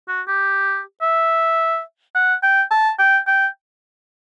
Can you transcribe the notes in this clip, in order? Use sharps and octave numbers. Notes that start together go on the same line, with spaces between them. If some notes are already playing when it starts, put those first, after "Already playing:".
F#4
G4
E5
F#5
G5
A5
G5
G5